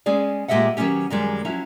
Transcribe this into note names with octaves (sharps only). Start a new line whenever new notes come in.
G#3 C#4 G#4 D5
A#2 G#3 G4 D#5 E5 F#5
D#3 F#3 A#3 B3 C#4 G4
F#2 D#3 G3 G#3
F3 F#3 C#4 E4